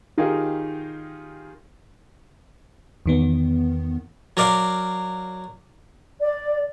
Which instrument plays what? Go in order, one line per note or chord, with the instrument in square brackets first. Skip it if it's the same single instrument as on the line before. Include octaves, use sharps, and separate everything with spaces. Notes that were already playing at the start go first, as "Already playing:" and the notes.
[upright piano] D#3 D#4 F4 G4 G#4 A#4
[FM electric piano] E2 D#3 B3
[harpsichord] F#3 A#4 D5 F5
[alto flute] D5